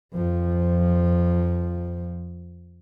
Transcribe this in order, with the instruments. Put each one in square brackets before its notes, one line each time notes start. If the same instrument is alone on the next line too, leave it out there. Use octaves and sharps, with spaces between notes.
[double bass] F2 F3